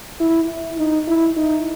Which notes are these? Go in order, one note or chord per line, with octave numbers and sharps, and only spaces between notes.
E4
D#4
E4
D#4